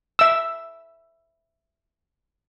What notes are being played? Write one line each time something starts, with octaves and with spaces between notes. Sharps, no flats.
E5 E6